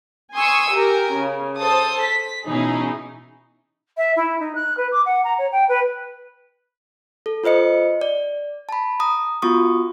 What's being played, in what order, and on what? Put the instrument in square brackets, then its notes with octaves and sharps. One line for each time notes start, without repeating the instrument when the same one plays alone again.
[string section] G#5 C6 C#6 D#6 E6
G4 A#4 G#5
C#3
A4 C5 A5 D#6
B6
B2 E3 C#4 D#4 E4 G#4
[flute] E5
E4
D#4
F#6
B4
D6
F#5
A#5
C#5
G5
B4
[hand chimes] A4
F4 B4 C5 D#5 C#7
D5
A5 B5
A#5 D#6
B3 F4 F#4 C#6 D#6